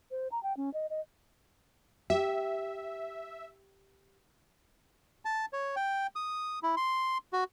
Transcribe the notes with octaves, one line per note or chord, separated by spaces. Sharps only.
C5
A#5
G5
C#4
D#5
D#5
G4 E5
A5
C#5
G5
D#6
E4
C6
F#4